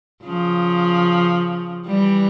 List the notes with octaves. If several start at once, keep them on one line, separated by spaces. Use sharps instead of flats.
C#3 F3
E3 G3